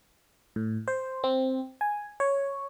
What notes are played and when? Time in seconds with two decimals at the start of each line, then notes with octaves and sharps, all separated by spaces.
0.56 A2
0.88 C5
1.24 C4
1.81 G#5
2.20 C#5